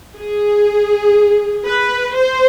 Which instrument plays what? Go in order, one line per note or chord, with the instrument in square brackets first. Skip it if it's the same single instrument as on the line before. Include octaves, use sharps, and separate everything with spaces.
[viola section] G#4
B4
C5